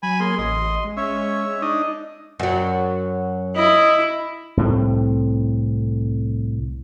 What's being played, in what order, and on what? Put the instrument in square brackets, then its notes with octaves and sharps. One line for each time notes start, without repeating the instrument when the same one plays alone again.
[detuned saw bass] F#3 [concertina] G#5 B5
[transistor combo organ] A#3 G#4 [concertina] C6
[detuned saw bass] A1 [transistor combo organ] D#5 [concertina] C6
[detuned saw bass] G#3
[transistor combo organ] C#4 [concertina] C#5 E5
[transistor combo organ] D4 D#4 D#5
[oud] F#2 F#3
[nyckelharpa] E4 [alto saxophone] D#5
[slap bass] C2 A2 A3 C4